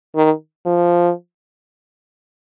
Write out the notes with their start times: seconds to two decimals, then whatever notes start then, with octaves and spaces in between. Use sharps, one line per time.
0.16 D#3
0.66 F3